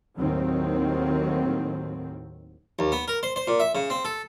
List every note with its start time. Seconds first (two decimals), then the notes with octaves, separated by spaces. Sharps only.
0.17 D#2 A2 D#3 F#3 C4
2.79 D#2
2.92 B3
3.08 A#4
3.23 C5
3.36 C5
3.48 A#2
3.60 E5
3.75 C#3
3.90 C4
4.05 A4